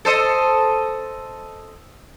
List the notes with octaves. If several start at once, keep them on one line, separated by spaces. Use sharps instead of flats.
A4 C5 D#5